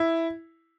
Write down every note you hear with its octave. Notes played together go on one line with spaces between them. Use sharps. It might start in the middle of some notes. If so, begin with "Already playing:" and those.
Already playing: E4